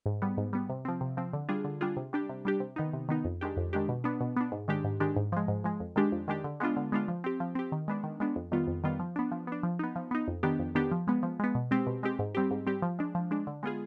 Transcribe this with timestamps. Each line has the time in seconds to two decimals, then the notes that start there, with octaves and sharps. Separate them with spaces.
0.06 G#2
0.22 G3 B3
0.38 G#2
0.53 G3 B3
0.69 C3
0.85 F3 C4
1.01 C3
1.17 F3 C4
1.33 D3
1.49 G3 D4 F4 G#4
1.64 D3
1.81 G3 D4 F4 G#4
1.97 C3
2.13 G3 D4 G4
2.29 C3
2.45 G3 D4 G4
2.60 C3
2.76 D#3 B3 D#4
2.93 C3
3.09 D#3 B3 D#4
3.25 F2
3.41 D#3 G#3 D4 G4
3.57 F2
3.73 D#3 G#3 D4 G4
3.88 B2
4.04 B3 D4
4.21 B2
4.36 B3 D4
4.52 G#2
4.68 D#3 G#3 D4 G4
4.84 G#2
5.00 D#3 G#3 D4 G4
5.16 G#2
5.32 F3 G#3
5.48 G#2
5.64 F3 G#3
5.80 F2
5.96 D#3 G#3 D4 G4
6.12 F2
6.28 D#3 G#3 D4 G4
6.44 D3
6.60 G#3 B3 D4 F4
6.76 D3
6.92 G#3 B3 D4 F4
7.08 F3
7.24 C4 G4
7.40 F3
7.55 C4 G4
7.72 D#3
7.88 G#3 B3 D4
8.04 D#3
8.20 G#3 B3 D4
8.36 F2
8.52 D#3 G3 B3 F4
8.67 F2
8.84 D#3 G3 B3 F4
8.99 F3
9.16 B3 D4
9.32 F3
9.47 B3 D4
9.63 F3
9.79 B3 D#4
9.96 F3
10.11 B3 D#4
10.28 F2
10.43 D#3 B3 D4 G4
10.59 F2
10.75 D#3 B3 D4 G4
10.92 F3
11.07 G#3 B3
11.23 F3
11.40 G#3 B3
11.55 B2
11.71 G#3 C4 G4
11.87 B2
12.03 G#3 C4 G4
12.19 G#2
12.35 G3 C4 G4
12.51 G#2
12.66 G3 C4 G4
12.82 F3
12.99 G#3 D4
13.15 F3
13.31 G#3 D4
13.47 D3
13.63 G#3 B3 F4 G#4